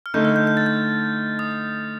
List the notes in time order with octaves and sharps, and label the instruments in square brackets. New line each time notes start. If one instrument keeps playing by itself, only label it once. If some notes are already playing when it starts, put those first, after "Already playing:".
[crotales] F6
[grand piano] D3 A3 D#4 [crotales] G6
[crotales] F6
G6
G6
A6
G6
D#6